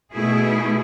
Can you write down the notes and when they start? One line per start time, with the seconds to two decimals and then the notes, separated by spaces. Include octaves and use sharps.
0.12 B2 A3 E4 G#4